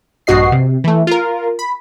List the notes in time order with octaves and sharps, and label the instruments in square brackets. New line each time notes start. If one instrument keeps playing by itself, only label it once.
[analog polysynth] A#1 G2 F#4 D#5 C7
C3
E3 A3
F4 A#4
B5